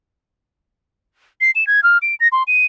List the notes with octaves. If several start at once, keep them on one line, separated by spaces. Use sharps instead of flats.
C7
E7
G#6
F6
D7
A#6
C6
D#7